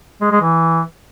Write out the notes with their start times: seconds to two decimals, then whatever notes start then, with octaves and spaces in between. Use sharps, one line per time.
0.21 G#3
0.31 G#3
0.41 E3